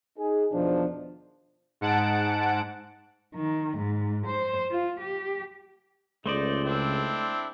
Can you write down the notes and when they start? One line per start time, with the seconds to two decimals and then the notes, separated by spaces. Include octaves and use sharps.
0.18 D#4 G#4
0.52 E2 B2 D#3 F3 D4
1.81 G#2 F#5 A5 D7
3.35 D#3
3.77 G#2
4.26 C5
4.71 F4
5.00 G4
6.26 C#2 A3 D#4 C5 D5
6.64 C4 D4 E4